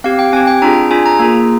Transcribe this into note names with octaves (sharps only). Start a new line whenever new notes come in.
C4 G4 F5
G5
C4 G4 G#5
G5
D4 F4 G#4 A#5
D4 F4 G#4 G#5
A#5
A#3 F4 G#4